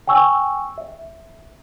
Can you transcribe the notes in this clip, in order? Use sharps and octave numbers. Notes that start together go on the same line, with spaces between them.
G5 G#5 C#6 E6
E5